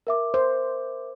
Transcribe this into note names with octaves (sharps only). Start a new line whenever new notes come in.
A#4 E5 D6
C5